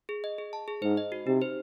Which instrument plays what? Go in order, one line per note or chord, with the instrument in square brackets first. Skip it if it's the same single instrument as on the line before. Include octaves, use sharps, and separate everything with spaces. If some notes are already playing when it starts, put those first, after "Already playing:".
[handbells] G#4
D#5
G#4
A5
G#4
[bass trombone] G#2 [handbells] C5
[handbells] D#5
F#4
[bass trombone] C3 [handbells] D#4
[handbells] C5